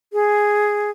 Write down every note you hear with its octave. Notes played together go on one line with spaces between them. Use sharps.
G#4